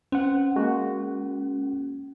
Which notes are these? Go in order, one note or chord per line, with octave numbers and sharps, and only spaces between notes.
C4 C#4 F#5
G#3 A#3 F#4